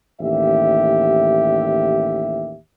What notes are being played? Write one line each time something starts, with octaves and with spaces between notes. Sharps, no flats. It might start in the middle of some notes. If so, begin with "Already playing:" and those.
A1 D#2 G4 E5